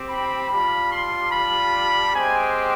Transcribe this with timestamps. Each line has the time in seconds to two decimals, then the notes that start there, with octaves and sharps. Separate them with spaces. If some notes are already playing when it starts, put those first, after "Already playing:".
Already playing: C4 G4
0.08 B5
0.49 G3 D4 F4 B5
0.90 C6
1.31 B5
2.13 G#3 C4 G4 G#5